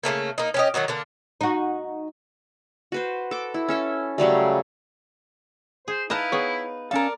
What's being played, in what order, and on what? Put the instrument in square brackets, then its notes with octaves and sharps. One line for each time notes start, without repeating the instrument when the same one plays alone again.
[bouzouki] C#3 E3 A3 A#3
A#3 D#4
C#4 G4 D#5
D#3 F#3 D#4 F#4
D3 A#3 D4
[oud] D#4 F#4
[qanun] F#4 B4 C5
A4 D6
E4
C#4 A4 E5
C#3 F#3 G3 A3
[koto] G#4 [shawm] C5
[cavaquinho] D#4 B4 F5 [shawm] E4 [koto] D#5 A5
[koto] B3 G#4 [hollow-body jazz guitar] C#5
[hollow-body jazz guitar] C#4 F5 [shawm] A4 [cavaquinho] A#4 D5